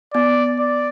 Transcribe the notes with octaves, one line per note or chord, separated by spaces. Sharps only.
B3 D5
D5